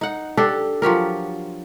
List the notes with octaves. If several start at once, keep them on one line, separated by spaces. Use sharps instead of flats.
D#4 F#5
D4 G4 A4
F3 F#3 G4 A#4